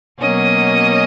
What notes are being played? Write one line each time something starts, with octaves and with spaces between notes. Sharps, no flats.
B2 F#3 A#3 C#4 D#5